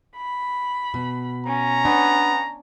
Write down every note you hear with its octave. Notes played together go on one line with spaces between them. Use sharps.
B5
B2
C#4 A#5
B3 D4